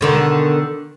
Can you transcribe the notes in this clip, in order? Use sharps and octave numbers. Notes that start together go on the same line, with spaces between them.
B2 D3 D#3